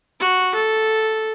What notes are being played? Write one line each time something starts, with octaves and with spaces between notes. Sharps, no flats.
F#4
A4